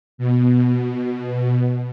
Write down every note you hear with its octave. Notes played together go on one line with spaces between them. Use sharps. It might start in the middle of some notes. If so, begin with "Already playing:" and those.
B2